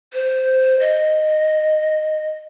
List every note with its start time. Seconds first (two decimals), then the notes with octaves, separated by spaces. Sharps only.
0.14 C5
0.80 D#5